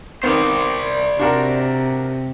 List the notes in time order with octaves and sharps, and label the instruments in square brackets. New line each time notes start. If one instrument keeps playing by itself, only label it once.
[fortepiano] D#3 B3 C4 [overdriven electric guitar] C5 D5
[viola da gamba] C3 [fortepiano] D4 F#4 A#4